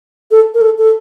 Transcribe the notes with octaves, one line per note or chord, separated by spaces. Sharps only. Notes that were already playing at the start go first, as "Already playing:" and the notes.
A4
A#4
A4
A4